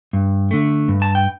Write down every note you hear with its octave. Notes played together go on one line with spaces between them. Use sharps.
G2
D3 A3
G2
A5
G5